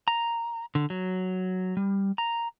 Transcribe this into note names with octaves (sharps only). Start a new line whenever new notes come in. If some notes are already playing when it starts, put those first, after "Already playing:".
A#5
D3
F#3
G3
A#5